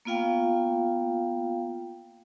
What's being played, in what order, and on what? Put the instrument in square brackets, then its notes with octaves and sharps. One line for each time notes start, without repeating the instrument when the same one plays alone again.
[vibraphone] A#3 B3 F4 F5 G5